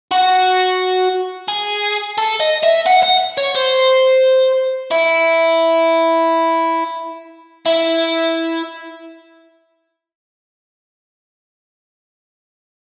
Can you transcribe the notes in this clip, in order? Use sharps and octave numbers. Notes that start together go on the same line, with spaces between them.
F#4
G#4
A4
D#5
E5
F#5
F#5
C#5
C5
E4
E4